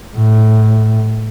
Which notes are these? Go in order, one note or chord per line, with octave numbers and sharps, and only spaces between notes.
A2